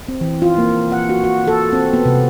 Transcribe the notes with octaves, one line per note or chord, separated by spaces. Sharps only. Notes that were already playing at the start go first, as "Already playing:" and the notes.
C4
E3
F4
A#3
F#5
F#4
F#4
A4
C4
B3
C3